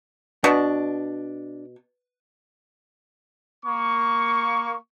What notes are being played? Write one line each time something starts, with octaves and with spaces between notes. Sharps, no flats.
B2 D4
A#3 C#6